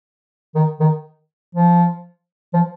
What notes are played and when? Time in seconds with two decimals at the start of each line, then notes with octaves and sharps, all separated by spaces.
0.55 D#3
0.80 D#3
1.55 F3
2.54 F3